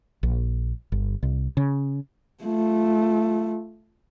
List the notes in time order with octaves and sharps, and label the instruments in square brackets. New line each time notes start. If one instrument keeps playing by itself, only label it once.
[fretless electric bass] A#1
G1
C2
C#3
[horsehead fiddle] A3 F4